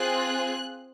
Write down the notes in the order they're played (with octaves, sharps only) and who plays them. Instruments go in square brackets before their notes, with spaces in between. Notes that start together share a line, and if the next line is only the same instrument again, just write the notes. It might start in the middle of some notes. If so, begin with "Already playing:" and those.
Already playing: [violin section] C4 F4 G#4 F#6